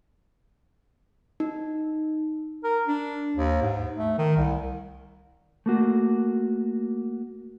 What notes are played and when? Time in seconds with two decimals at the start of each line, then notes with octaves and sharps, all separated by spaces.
1.40 D#4
2.64 A#4
2.87 D4
3.36 D#2
3.62 G#2
3.97 A3
4.18 D#3
4.37 C2
5.66 A3 A#3 F#4